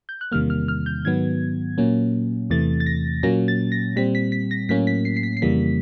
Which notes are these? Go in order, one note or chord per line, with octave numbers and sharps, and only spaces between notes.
G6
F#6
E2 C3 D#3 G3 A#3 F6
F6
F6
G6
G#2 D#3 F#3 B3 G#6
A#2 F#3 A#3 C#4
E2 C3 E3 A3 A6
A6
A#6
A#2 F#3 A#3 C#4 A#6
A6
A#6
A#2 G3 C4 B6
B6
B6
A#6
A2 F#3 A#3 C#4 B6
B6
C7
C7
B6
C7
F2 C#3 E3 G3 A#3 B6